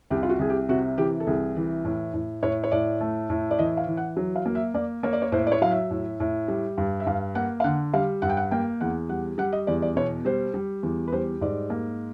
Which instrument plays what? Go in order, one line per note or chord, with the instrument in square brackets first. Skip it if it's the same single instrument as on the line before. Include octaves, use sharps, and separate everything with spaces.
[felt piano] C2 G4
F4
F#4
C2 G#4
G4
C3 F#4
E3 G4
A4
C2 G#4
E3
A2
A2
A2 C#5
C#5
A2 D5
A3
A2
D5
E3 D#5
F5
E3
F#5
F#3
F5
A#3
E5
A#3 D5
A#3 C#5
D5
C#5
A2 C5
D5
C#5
F#3 F5
E5
A2
A2
G3
G2
E5
G2 F5
A#3 F#5
F5
D3 F#5
G3 F5
G2 F#5
G5
F#5
A#3 G5
E2 F#5
G3 F#5
G3 F#5
D#5
E2 D5
D5
B2 C#5
G3 C5
G3
E2
B4
G3 C5
G#2 D5
A#3